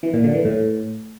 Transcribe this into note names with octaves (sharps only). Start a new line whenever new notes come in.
E3
A#2
D3
E3
A2